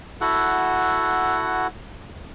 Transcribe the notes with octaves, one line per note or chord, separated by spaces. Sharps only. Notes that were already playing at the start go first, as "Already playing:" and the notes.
E4 F#4 A4 F#5